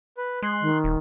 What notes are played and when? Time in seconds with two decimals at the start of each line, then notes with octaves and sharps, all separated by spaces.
0.17 B4
0.42 G#3 C6 F#6
0.61 D#3
0.84 D#1